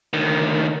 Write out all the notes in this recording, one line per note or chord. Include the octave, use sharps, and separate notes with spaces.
D2 D#3